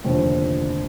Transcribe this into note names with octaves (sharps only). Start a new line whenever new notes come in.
F1 D#2 D3 F3 C4